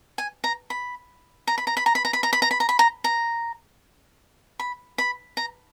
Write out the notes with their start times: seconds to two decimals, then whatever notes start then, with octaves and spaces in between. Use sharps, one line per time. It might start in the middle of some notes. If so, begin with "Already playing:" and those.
0.18 G#5
0.44 A#5
0.70 B5
1.47 A#5
1.58 B5
1.67 A#5
1.77 B5
1.86 A#5
1.95 B5
2.05 A#5
2.13 B5
2.23 A#5
2.33 B5
2.42 A#5
2.51 B5
2.60 A#5
2.69 B5
2.79 A#5
3.04 A#5
4.59 B5
4.98 B5
5.37 A#5